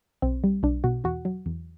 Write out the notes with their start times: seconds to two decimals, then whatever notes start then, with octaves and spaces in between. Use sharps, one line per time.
0.22 B1 C4
0.44 G3
0.63 B1 D4
0.84 B2 F#4
1.04 E2 F#4
1.25 F#3
1.46 E2